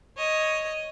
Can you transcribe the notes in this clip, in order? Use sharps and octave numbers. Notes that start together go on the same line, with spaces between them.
C#5 D#5